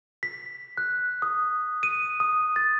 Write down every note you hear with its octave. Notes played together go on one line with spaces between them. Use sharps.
B6
F#6
D#6
D#7
D#6
A6